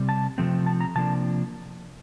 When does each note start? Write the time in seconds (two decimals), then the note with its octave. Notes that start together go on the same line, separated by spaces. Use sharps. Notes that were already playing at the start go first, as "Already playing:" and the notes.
Already playing: C3 G3 C4
0.09 A5
0.38 C3 F3 A3 C4
0.66 A5
0.81 A#5
0.95 C3 F3 A#3 D4 A5